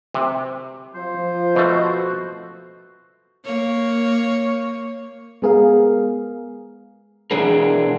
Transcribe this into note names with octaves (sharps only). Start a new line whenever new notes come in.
C3
F3 C5
B2 A3 F#4
A#3 C#5
G#3 B3 G#4 A#4 F5
B2 E3 G#3 D4 G#4 A#4